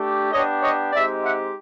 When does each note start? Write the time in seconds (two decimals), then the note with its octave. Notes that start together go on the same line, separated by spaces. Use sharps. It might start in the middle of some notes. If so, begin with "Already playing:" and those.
Already playing: A3 D4 G4
0.32 B3 D4 G4 C#5 D#5
0.62 C#5 D#5
0.93 G#3 C4 D#4 G4 D5 E5
1.23 E5 F#5